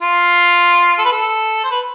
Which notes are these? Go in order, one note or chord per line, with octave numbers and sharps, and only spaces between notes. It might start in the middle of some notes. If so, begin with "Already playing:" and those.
F4
A4
B4
A4
C5
B4